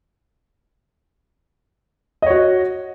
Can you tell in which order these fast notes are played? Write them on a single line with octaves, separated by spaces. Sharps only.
D#5 C#5 F#4